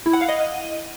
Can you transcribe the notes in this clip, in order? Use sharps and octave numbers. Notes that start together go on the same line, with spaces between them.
E4
F#5
F5
D#5